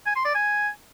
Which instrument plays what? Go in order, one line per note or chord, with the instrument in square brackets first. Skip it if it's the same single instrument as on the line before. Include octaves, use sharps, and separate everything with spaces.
[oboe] G#5
C6
D5
G#5